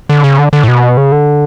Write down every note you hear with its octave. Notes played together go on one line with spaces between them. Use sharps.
D3
C#3
D3
D3
A2
B2
C#3
D3